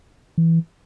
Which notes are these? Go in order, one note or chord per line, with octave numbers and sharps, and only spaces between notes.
E3